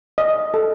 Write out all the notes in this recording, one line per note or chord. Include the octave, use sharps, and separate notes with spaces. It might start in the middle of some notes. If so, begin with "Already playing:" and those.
D#5
A4